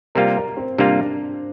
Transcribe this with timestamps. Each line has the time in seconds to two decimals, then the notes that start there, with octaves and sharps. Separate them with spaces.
0.15 C3 G3 A#3 F4 A#4
0.36 A#4
0.57 C4
0.78 C3 G3 A#3 D4 F4